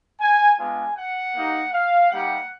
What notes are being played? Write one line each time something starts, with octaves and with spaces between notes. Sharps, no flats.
G#5
G#3 B3 D4 F4 G#5
F#5
A#3 D#4 G4
F5
G3 A#3 D#4 G4 F#5